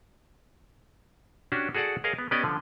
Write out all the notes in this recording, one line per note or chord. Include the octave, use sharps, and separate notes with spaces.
C#4 D4 F#4 G4
F#4 G#4 A4 D5 F#5
G#4 A#4 C#5 D#5 F5
B3
B3 C#4 G4 D5 D#5
D3 F3